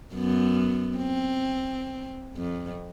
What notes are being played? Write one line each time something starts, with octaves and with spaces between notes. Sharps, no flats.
F#2 B3
C4
F2